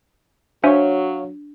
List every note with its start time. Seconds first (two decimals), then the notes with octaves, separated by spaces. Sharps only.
0.64 F#3 D4 C5 C#5 E5 F5 G#5